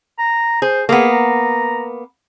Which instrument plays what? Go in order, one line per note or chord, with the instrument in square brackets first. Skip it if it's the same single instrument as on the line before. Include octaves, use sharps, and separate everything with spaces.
[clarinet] A#5
[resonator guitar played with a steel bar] G#4 [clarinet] C5
[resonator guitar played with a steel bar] A#3 B3 [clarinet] G#4
[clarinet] A#5